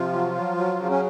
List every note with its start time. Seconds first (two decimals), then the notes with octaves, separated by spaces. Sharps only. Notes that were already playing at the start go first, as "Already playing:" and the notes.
Already playing: C3 F3 F4
0.14 F#3
0.35 F#3
0.57 F#3
0.79 C#3
0.90 C#4